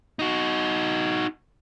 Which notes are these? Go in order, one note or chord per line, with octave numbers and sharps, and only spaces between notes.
D#4 F#4